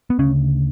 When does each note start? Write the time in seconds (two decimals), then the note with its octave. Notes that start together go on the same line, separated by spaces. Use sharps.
0.10 B3
0.19 D2 C#3 C#4